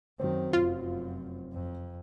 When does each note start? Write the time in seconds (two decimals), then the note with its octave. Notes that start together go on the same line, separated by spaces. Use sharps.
0.20 F#2 D#3 F#3 C4
0.53 F1 F#2 F4
1.53 F2